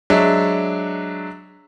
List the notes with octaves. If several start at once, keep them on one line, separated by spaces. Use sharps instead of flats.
F#3 G#3 D4 E5